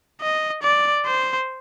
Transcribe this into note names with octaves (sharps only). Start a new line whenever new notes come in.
D#5
D5
C5